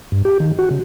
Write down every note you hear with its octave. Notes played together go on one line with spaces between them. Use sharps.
G2
G4
D#3
F#4
C#3